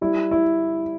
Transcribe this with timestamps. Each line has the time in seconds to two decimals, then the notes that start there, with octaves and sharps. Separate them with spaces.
0.01 G3 E4
0.31 E4